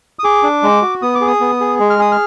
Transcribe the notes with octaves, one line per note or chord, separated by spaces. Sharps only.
D#6
G#4 D6
D4
G#3
F#4
B3 D#6
D6
G#4
D#6
B3
G#4
G#3
F6
G#4 D#6
F6